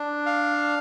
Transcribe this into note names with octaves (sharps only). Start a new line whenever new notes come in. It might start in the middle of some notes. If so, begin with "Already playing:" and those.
Already playing: D4
F5